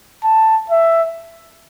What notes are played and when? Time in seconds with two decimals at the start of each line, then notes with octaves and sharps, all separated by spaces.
0.24 A5
0.70 E5